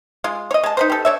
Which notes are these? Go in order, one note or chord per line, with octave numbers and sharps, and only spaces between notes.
G#3 F4
C#5 D#5
G#3 A5
D#4 B4 C5
G4 A4
D4 C#5 E5